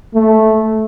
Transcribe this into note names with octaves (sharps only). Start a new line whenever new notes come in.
A3